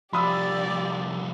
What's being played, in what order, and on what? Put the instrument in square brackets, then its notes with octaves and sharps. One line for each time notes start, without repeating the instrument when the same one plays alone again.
[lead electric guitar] C2 F3 [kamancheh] G4 D5 [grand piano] B5 D#6 E6